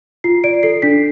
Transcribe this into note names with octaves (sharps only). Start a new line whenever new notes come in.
F4 C7
D5 D7
A4 C7
D4 B6